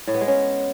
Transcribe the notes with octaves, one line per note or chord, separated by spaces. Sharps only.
A2
B3
G#3
C#4